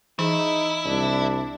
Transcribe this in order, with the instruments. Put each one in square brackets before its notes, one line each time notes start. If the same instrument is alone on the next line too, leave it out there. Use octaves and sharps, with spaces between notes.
[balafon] E3 G#4 [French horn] D#4 [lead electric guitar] E4
[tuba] C2 [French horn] D4